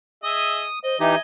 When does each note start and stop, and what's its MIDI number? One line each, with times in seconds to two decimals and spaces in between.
0.23 0.64 68
0.23 0.64 75
0.23 0.64 76
0.23 0.79 87
0.84 0.99 72
0.84 1.00 75
1.00 1.16 52
1.00 1.16 63
1.00 1.16 67
1.00 1.20 75
1.00 1.19 76
1.00 1.20 80